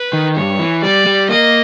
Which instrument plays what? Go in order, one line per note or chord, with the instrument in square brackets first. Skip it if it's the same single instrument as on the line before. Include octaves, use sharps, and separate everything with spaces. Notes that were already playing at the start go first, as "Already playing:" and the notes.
Already playing: [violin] B4
[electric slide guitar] D#3
[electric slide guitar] G2 [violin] C#5
[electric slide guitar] E3
[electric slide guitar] G3 [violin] D5
[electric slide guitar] G3
[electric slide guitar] A#3 [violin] D#5